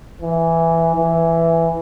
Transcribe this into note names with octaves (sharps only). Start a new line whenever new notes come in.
E3
E3